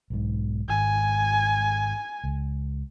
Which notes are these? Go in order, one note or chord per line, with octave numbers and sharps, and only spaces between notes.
B1 G#2
G#1 G#5
C#2